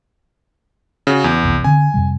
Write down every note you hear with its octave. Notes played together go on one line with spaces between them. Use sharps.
C#3 F#4
E2
F1 C2
D3 C4 G#5
F2 C3 G3